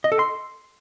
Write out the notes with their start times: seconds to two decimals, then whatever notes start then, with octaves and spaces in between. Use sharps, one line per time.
0.04 D#5
0.12 A4
0.19 C6